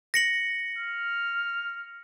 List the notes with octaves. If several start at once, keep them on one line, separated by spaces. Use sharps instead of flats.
A#6 C#7 F#7
F6